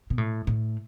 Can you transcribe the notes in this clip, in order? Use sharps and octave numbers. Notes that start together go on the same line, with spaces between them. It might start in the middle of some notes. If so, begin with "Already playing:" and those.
B2
A2
A2